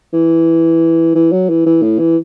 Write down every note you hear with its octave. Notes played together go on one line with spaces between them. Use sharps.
E3
E3
F#3
E3
E3
A2
E3